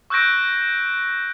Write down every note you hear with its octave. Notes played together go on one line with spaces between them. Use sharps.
C#6 E6 F#6 G6 A#6 D7